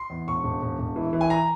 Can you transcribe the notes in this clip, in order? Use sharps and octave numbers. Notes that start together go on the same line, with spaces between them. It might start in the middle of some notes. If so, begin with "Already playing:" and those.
Already playing: C6
E2
E1 C#6
E1
E1
E1
E3
E3
G#5
A#5